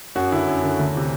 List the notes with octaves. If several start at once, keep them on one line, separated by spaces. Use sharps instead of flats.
F#2 F#4
D3 E4
F#2
D3
D2
C3 E3